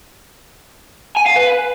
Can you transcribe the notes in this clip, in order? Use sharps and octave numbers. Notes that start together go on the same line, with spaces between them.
G#5
F5
B4